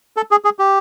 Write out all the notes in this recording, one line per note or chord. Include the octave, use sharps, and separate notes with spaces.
A4
G#4
G#4
G4